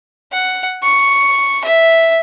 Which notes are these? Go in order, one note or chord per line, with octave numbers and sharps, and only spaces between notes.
F#5
C#6
E5